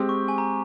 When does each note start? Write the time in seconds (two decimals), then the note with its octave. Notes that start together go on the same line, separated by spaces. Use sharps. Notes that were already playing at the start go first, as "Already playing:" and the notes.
Already playing: G#3 C4 G4
0.09 C#6
0.28 G#5
0.38 A#5